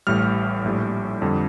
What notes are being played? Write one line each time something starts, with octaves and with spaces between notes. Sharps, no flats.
A1 A2 G3 F6
A#1 A2 G3
F2 D3 G3